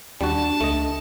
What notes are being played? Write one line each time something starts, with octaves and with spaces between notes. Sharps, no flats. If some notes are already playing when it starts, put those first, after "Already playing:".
D#2 G3 D4 F#4 A5
C#2 A3 D#5